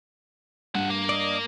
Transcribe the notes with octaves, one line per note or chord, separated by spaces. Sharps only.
G2 A#2 F#5
A#3
D5 D#5